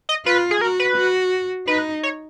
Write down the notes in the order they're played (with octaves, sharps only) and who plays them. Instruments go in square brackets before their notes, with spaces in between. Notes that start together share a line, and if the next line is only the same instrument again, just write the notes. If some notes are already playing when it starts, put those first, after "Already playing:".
[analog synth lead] D#5
[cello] F4 [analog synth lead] B4
[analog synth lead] G#4
[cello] F#4 [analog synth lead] A#4
[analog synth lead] B4
[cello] F#4
[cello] D#4 [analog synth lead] B4
[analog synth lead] C#5